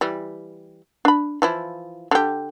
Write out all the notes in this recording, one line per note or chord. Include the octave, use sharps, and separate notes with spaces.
E3 G3
D4 B5
E3 F3 E4
D3 G4